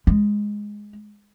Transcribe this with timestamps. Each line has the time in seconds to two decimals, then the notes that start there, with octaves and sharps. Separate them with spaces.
0.07 G#3